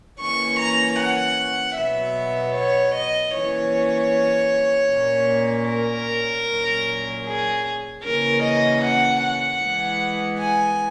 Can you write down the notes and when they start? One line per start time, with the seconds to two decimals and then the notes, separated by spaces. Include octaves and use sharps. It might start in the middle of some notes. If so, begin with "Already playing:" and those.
0.20 E3 A#3 C#4 C#6
0.59 A#5
0.99 F#5
1.77 B2 F#3 B3 E5
2.55 C#5
2.95 D#5
3.34 E3 A#3 C#4 C#5
4.91 A#2 A#3 C#4
5.70 A#4
6.48 A#2 F#3 C#4
7.26 G#4
8.04 C#3 E3 A#3 C#4 A#4
8.44 D#5
8.84 F#5
9.23 F#5
9.62 E3 G#3 B3
10.40 G#5